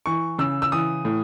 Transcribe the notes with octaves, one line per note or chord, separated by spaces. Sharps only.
E3 C#6
C#3 E6
E6
E3 D#6
A2